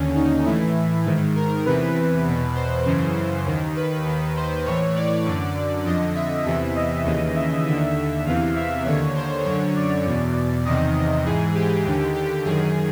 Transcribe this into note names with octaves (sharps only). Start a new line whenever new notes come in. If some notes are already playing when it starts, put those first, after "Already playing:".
Already playing: D#2 D3 C#4
D#4
A2 E3 E4
G#2 D#3
A#4
E2 C3 E3 B4
B4
E2 B2
C5
F#2 C#3 E3
D#2 D#3
B4
D#2 D#3
C5
A2 E3 C#5
D5
F#2 D3
F2 D3 D#5
E5
E2 C3 E3
D#5
D#2 C#3 E3
E5
D#2 D3 E5
E2 C3 E3 F5
E5
D#2 D3 C#5
C5
F#2 D3 C#5
D5
E2 B2
E2 C3 D#3 D#5
G#2 E3 G#4
G4
D#2 D3
G4
F#2 D#3 G#4